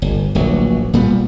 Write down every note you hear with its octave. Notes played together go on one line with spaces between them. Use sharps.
G1
D1 A#1 F#3
A#2 G3 B3